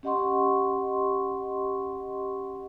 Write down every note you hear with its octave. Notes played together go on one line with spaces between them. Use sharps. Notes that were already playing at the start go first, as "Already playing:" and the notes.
C#4 G4 D#5 F#5 C6 C#6